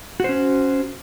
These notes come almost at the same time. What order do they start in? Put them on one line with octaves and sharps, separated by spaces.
F#4 C5 C#4